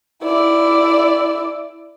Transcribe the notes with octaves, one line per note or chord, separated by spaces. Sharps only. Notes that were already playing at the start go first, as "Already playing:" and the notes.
E4 D5